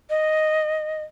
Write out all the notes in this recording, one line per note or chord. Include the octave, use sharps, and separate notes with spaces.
D#5